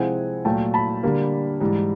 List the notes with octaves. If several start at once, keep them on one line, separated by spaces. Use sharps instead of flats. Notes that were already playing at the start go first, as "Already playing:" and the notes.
Already playing: C3 F3 G#3 C4 E4 F#5 G#5
A#2 F#3 A3 G5 A5
A5 B5
D3 G3 A#3
G#2 E3 G3